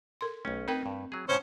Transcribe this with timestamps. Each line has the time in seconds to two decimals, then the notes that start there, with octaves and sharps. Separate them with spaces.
0.21 A4 A#4 C6
0.45 B1 A3 C#4
0.68 C4 D#4 A#4 B4 G5
0.86 G2
1.12 F#3 G#4
1.29 A2 C#3 C#4 C5 C#5